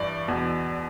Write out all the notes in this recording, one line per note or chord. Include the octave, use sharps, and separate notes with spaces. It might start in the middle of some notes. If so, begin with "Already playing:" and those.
Already playing: G2 E3 D5
E2 B2